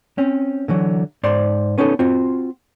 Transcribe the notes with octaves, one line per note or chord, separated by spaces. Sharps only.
C4 C#4
D3 E3 F#3
G#2 C5 D5 C6
B3 C#4 D#4 F#4 A4
C4 F4 F#4